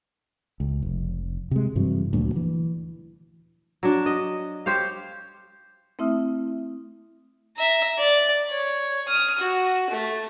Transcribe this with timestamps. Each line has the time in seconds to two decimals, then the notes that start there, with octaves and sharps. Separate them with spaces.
0.60 C#2
0.82 F1
1.51 C3 G#3
1.75 G2 C3 E3 F#3
2.13 D2 A#2 F#3
2.36 E3
3.83 F#3 D4
4.06 D#5
4.66 G4 C5 C#5 F5
5.99 A3 C4 E4 E5 D#6 F6
7.57 E5 A#5
7.98 D5
8.49 C#5
9.08 D#6 F6
9.38 F#4
9.90 A3